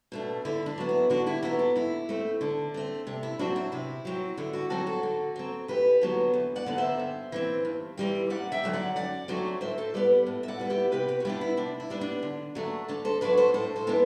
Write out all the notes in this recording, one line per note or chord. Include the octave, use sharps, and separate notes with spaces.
B2 A3 D4
D3 E4
D4
F#3 B3
E4
D3 D4 F#4
E4 G4
F#3 B3 E4
D4
D3 E4
A3 C4
D3 D4
A3 C4
C3 D4
E4
F#3 C4 D4 F#4
E4
C3 E4
F#3 C4
D3 E4
D4 F#4
F#3 C4 F#4 A4
F#4 A4
D3
F#3 C4
E2 G4 B4
D3 F#3 B3
E2
D5 F#5
D3 F#3 B3
C5 E5
G2
E3 G3 C4
G2
E3 G3 C4
F#2 D5 F#5
E5 G5
D3 F#3 A3 C4
D5 F#5
F#2 D5 F#5
D3 F#3 A3 C4
A2 C5 E5
A4 C5
G3 B3 B4 D5
A2
E5
D5 F#5
G3 B3
E4 G4
C3 G4 B4
G4 B4
F#4
G3 B3 D4 E4 G4
E4
C3 D4
E4
G3 B3 D4
D4
D3
F#3 A3 D4
D3 D4
A4 C5
F#3 A3 D4 B4 D5
A4 C5
A2 A4 C5
A4 C5
E3 B3 D4